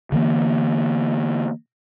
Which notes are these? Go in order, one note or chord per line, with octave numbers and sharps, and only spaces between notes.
D3 E3 A#3